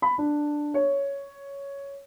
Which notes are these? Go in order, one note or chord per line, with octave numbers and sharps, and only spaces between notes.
B5
D4
C#5